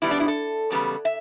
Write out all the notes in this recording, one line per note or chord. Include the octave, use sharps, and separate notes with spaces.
B2 G3 B3 E4
D4
E4
A4
E2 C#3 G3 B3
E5